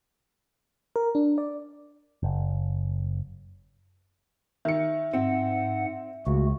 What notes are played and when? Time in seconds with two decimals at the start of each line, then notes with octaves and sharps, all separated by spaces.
0.96 A#4
1.15 D4
1.38 D5
2.23 F#1
4.65 D#3 E5 C#7
5.13 G#2 C4 F#5
6.27 C#2 A3 F#4